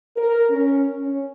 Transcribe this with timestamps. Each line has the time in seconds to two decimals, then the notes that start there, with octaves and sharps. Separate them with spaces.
0.17 A#4
0.49 C#4
0.98 C#4